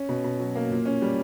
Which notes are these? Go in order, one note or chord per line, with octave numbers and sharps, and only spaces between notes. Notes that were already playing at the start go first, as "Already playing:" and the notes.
Already playing: C#4
B2
B2
F#3
A#3
A#2
C#4
G3